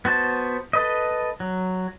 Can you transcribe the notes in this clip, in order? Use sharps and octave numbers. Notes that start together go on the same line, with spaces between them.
B3 F#4 C5 A5
A4 B4 D#5
F#3